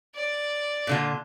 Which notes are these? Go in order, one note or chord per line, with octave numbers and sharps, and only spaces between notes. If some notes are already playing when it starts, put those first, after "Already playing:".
D5
A#2 D3 F4